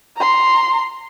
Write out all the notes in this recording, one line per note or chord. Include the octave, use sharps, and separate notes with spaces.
A#5 C6